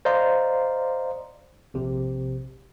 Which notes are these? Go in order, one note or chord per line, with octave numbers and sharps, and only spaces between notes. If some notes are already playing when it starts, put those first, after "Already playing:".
C5 D5 D#5 F5 A#5 C6
A#1 C3